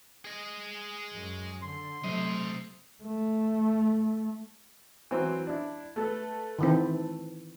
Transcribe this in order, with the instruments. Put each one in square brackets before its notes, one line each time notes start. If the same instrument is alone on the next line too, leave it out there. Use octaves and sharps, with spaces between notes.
[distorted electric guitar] G#4 D#5
[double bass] F#2
[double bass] D3 [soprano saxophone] C6
[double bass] C3 A3 [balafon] F#3 [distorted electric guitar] C5 D#5
[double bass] A3
[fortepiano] E3 F#3 C4
D4 E4
A3 A4 B4
[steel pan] D#3 E3 C4